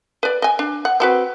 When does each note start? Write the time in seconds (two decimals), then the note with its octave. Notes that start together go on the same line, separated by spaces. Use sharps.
0.23 B4 D5
0.42 D#5 G#5
0.59 D4
0.85 F#5
1.00 C4 F#4 B4